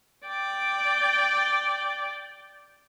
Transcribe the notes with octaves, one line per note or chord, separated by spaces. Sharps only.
D5 G5